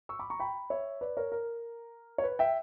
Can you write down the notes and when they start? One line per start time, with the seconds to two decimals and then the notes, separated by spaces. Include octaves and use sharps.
0.09 C#6 E6
0.19 B5 D6
0.30 A#5 C#6
0.40 G5 B5
0.70 C#5 E5
1.01 B4 D5
1.17 A#4 C#5
1.32 A#4
2.18 C#5
2.24 B4
2.39 E5 G5